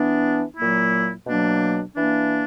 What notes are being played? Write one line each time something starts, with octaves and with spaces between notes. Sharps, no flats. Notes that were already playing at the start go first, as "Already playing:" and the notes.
Already playing: E3 B3 D4
A#2 F#3 A#3 E4
B2 F#3 A#3 D4
E3 A#3 D4